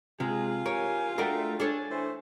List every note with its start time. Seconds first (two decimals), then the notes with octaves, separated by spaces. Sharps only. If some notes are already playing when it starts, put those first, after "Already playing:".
0.20 C3 G#3 F4 G#4
0.66 G4 A#4 C#5 G#5
1.18 A3 D4 F#4 G#4 A#4 D5 E5 G5
1.60 D4 A4 C#5 G#5
1.90 E3 A3 C5